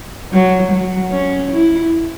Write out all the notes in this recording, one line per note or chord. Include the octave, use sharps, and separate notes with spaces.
F#3
F#3
C#4
E4